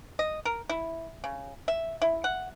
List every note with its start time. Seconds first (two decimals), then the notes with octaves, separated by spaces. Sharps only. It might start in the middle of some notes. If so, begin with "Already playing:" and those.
0.19 D#5
0.45 A#4
0.69 E4
1.24 C#3
1.68 E5
2.02 E4
2.24 F#5